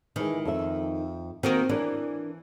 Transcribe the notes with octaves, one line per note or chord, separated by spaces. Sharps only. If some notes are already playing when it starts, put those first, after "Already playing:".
D#3 E3 G#3
F2 A4 E5
D#3 A#3 C4 F#4 A#4
E3 D4 A#4 D5